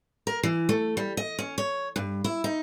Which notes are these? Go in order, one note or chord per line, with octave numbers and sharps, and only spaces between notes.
A#4
E3
A3
G3
D#5
C#4
C#5
G2
E4
D#4